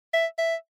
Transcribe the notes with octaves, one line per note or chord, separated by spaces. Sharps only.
E5
E5